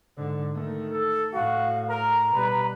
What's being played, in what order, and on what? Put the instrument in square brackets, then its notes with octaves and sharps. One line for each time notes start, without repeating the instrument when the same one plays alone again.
[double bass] G#2 D3
D#3 A3
[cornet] A4
[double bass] A2 [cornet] F#4 [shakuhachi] F5
[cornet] A#4 [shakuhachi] A#5
[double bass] B2 G3 [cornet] B4